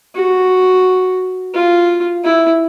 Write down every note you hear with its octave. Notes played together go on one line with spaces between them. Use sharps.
F#4
F4
E4